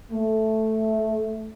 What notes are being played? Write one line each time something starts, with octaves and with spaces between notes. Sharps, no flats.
A3